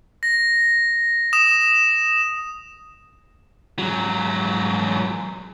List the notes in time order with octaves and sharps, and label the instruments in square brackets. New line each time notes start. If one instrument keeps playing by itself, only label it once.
[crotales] A#6
D#6 E7
[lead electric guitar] G#2 F#3